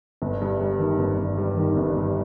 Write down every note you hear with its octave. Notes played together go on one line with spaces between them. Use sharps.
G1
G2
G3
D#3
G1
G2
G3
D#3
G1
G2